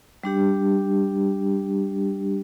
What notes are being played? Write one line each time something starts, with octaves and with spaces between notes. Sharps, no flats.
G3 D4 G4